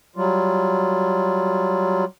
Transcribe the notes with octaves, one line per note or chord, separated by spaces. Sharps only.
F#3 G3 F4